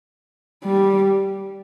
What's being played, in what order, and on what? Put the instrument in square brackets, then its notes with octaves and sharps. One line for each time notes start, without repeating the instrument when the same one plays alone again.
[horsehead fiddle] G3